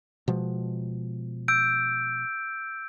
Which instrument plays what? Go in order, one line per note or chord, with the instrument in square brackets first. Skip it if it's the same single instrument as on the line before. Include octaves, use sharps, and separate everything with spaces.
[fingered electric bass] B2 F3 G#3
[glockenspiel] E6 G6 D7